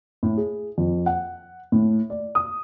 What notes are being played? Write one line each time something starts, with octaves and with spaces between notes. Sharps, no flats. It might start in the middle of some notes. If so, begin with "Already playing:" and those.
A2
G#4
F2
F#5
A2
D5
D#6